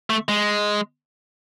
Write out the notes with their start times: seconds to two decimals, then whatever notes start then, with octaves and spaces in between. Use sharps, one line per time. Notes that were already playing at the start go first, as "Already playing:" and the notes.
0.10 A3
0.29 G#3